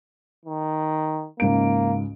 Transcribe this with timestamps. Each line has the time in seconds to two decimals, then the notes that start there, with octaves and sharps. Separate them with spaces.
0.45 D#3
1.40 C#2 G#2 A#3 D7